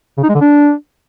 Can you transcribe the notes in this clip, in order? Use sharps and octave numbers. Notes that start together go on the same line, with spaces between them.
C#3
D#4
G#3
D3
D4